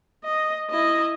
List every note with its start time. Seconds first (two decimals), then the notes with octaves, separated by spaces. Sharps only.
0.25 D#5
0.71 E4 D#5